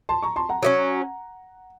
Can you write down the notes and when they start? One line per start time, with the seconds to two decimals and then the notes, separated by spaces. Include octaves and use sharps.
0.09 A5 C6
0.22 A#5 C#6
0.36 A5 C6
0.49 F#5 A#5
0.63 F#3 A#3 C#4